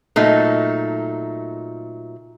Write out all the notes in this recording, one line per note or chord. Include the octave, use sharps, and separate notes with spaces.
A#2 F#3 A3 D#4